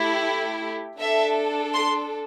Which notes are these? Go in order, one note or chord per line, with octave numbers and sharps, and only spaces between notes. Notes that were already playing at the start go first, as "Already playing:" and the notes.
Already playing: A3 E4 G4
D4 A4 E5
C6